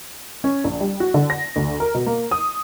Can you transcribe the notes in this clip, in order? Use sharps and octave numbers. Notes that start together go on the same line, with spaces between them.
C#4
A#1
G3
F#4
D3
A#6
D2
A#4
B2
A#3
D#6